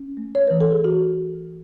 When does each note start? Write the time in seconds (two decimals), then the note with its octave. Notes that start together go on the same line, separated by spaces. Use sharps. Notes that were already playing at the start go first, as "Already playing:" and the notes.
Already playing: C#4
0.17 A3
0.35 C#5
0.47 E3 B4
0.61 A4
0.72 G#4
0.84 E3 F#4